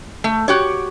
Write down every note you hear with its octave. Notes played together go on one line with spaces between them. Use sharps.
A3
F#4 G4 C#5